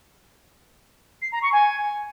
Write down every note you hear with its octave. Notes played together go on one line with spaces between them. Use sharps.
C7
A#5
C#6
G#5